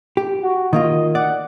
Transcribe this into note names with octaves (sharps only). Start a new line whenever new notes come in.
G4
F#4
D#3 A#3 F4 D#5
D5 F#5